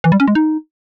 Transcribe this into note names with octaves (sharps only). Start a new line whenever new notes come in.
E3
G3
C#4
G#3
D#4